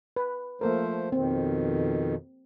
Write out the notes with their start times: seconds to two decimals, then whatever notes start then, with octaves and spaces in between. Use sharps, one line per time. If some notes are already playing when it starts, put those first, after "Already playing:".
0.16 B4
0.61 F3 A3 A#3 A4 A#4 C5
1.12 F2 B2 D#3 C4